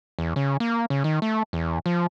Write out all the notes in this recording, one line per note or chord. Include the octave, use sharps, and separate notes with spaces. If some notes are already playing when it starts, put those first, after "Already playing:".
E2
C#3
A#3
C#3
D#3
A3
E2
F3